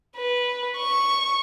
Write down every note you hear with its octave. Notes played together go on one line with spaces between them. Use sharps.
B4
C#6